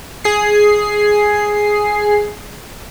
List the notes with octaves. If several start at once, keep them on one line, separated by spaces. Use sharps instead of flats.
G#4 C7